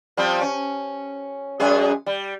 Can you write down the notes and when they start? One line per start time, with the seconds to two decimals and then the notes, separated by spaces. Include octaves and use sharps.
0.17 F3 G3 C4
0.41 C#4
1.60 F#2 G#3 G#4
2.06 G3